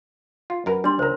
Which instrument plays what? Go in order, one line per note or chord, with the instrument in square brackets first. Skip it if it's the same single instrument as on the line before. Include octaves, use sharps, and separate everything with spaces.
[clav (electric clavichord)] F4
F#2 A#4 B4
[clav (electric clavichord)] G3 [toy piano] D4 C6
[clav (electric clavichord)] C#2 A#5 [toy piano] A#4 C5